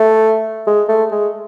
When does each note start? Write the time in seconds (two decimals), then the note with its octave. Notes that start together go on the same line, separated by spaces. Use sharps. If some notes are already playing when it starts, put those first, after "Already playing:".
Already playing: A3
0.67 G#3
0.88 A3
1.11 G#3